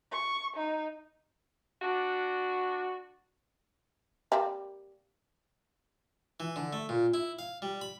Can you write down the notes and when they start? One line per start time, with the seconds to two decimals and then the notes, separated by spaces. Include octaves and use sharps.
0.12 C#6
0.57 D#4
1.82 D4 F#4
4.32 G3 A#3 C4
6.40 E3
6.56 D3
6.73 A3
6.89 A#2
7.14 E4
7.39 F5
7.62 G3
7.81 B5